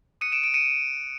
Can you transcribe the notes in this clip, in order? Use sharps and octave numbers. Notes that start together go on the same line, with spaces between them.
D#6 F#6 C#7 D#7
D7 E7
D7 E7
C#7 D#7